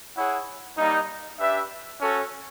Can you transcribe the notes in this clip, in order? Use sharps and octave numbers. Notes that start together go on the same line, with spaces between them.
E4 G#4 C#5 F#5
G3 A#3 D#4
D4 G4 B4 E5
C#4 F#4 A4